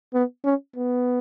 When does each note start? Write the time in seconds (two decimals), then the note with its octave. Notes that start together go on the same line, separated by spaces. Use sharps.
0.14 B3
0.45 C#4
0.76 B3